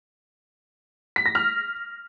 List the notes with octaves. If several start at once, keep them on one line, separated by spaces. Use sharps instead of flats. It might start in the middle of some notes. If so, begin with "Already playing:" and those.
B6
A#6
F6